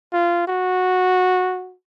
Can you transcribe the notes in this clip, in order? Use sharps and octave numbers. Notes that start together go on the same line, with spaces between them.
F4
F#4